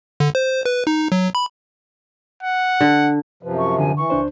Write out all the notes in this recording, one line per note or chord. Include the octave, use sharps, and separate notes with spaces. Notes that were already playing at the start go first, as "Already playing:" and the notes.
D3
C5
B4
D#4
F#3
B5
F#5
D3
F#2 C3 F3 B4
C#6
D3 G#5
E3 C#6
C#2 D4 C5